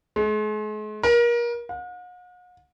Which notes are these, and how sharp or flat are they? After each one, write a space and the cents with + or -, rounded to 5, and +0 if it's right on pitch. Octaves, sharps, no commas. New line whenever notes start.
G#3 +40
A#4 +30
F#5 -45